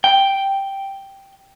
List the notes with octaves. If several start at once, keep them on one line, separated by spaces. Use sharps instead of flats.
G5